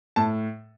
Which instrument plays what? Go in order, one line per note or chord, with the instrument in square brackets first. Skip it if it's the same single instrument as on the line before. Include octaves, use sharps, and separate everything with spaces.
[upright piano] A2 A5